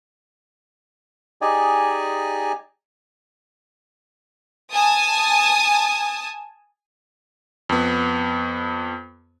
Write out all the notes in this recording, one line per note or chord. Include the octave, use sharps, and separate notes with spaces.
D#4 G4 G#4 D5 D#5 G#5
G#5 A5 D#6
F2 B3